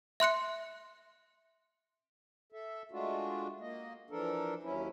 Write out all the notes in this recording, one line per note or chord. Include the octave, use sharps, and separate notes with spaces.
E5 C6 F#6 C#7
A4 E5
G#3 A3 D4 F4 F#4
A#3 D#5
E3 F3 D4 A4 A#4
D#2 F#3 C#4 E4